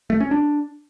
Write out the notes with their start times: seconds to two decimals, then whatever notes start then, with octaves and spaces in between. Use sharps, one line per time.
0.10 A3
0.20 C#4
0.31 D4